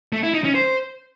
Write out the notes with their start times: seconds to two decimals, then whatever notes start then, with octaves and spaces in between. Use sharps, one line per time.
0.13 A3
0.23 E4
0.34 D#4
0.44 C#4
0.55 C5